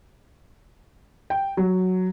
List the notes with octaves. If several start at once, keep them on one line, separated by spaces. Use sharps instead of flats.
G5
F#3